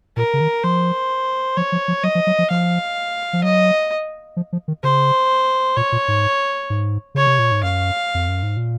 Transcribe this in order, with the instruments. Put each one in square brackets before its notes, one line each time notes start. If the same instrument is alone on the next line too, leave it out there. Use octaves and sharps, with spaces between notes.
[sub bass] A#2 [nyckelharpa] A#4
[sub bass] C#3
D#3
[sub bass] F3 [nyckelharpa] C5
[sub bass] F3 [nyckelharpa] C#5
[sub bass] F3
F3
[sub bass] F#3 [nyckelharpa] D#5
[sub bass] F3
F#3
F3
[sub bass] F3 [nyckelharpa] F5
[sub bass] F3
[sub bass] F#3 [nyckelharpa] D#5
[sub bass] F3
F3
D#3
[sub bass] C#3 [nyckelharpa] C5
[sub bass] A#2 [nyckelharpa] C#5
[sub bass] A#2
G#2
G#2
[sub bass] C#3 [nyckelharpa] C#5
[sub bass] C3
A#2
G#2
[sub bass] F#2 [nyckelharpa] F5
[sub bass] F2
F#2
G#2
A#2